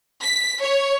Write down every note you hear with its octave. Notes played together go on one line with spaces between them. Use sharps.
B6
C#5